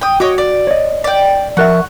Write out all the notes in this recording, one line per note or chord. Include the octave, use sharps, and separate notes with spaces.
G5 D#6
F#4 C#5 D#5 D6
D5
C#5 D#5
D5 G5
F3 A#4 E5 F#5 C#6